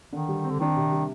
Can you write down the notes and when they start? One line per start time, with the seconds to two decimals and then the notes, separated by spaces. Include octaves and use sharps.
0.12 D3 D#3
0.29 G3
0.44 C4
0.50 D3
0.60 D#3 D4
0.77 C3
0.92 G3